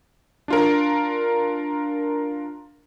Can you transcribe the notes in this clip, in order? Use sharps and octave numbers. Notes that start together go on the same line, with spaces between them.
D4 F4 A#4